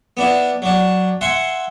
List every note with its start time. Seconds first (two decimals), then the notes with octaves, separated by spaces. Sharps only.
0.17 B3 D4 E4
0.62 F#3 D4
1.21 E5 F#5 G#5 C6